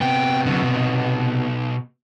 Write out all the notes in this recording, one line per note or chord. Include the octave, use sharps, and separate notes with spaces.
C3 B3 G5
D3 F#3
B2 D#4